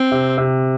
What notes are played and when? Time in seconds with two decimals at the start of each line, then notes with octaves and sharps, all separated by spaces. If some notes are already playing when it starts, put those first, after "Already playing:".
Already playing: C4
0.12 C3
0.38 C3